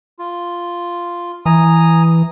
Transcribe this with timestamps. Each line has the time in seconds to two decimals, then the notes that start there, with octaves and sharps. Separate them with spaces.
0.19 F4
1.46 E3 G#5 A#5 D#6